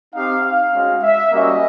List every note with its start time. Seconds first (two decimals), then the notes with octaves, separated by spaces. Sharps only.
0.14 C4 D#4 G4 F5
0.43 F5
0.73 G#3 C#4 F#4
1.03 E5
1.32 G3 A#3 C#4 F#4 D#5